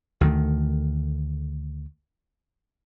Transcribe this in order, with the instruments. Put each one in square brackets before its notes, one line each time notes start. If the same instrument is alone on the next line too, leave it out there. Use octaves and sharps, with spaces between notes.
[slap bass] D2 D#3 A3